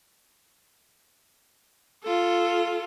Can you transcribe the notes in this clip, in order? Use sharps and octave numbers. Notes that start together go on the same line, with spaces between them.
F4 A4